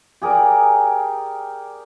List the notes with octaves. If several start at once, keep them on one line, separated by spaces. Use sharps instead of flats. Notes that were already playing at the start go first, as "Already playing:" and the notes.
G4 G#4 A#4 D5